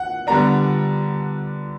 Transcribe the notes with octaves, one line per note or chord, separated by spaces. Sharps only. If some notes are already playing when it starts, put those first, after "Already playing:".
Already playing: F#5
D3 G3 B3 D4 A#5